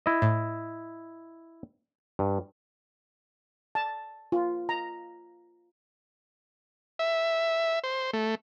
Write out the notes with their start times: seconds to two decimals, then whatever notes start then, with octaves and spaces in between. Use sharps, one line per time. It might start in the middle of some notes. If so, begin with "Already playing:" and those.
0.06 E4 D#5
0.22 A2
2.19 G2
3.75 A5
4.32 F4
4.69 A#5
6.99 E5
7.84 C5
8.13 A3